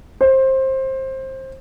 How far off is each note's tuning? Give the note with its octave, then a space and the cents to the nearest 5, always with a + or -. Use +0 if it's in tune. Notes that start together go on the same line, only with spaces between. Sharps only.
C5 +20